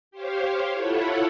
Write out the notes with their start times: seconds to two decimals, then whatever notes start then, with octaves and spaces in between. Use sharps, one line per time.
0.11 G4 C5 C#5 F5
0.73 E4 F4 A4 C#5 F#5 B5